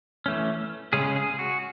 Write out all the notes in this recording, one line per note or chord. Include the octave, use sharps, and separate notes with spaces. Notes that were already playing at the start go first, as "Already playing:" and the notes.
E3 A3 C#4
C#3 G#3 C#4 G#4
G#4
F#4